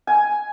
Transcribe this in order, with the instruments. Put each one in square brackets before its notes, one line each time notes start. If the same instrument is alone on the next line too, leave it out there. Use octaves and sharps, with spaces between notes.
[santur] G#5